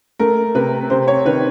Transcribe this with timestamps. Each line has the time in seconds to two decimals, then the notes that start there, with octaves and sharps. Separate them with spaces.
0.19 A3 A#4
0.55 C3 B4
0.90 C3 C5
1.08 C#5
1.25 D#3 B4